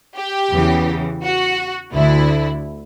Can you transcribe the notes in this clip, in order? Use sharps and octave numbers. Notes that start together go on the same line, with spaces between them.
G4
E2 C#3 E3
F#4
D2 D3 E4